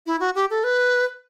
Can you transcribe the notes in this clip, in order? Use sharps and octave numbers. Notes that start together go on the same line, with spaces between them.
E4
F#4
G4
A4
B4